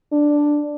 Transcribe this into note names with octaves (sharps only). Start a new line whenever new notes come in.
D4